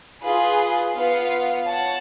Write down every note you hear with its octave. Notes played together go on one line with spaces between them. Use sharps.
F4 G#4 B4
B3 F4 B4 F5
C#5 F#5 A5